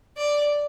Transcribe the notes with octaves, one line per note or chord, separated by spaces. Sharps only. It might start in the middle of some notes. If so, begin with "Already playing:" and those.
D5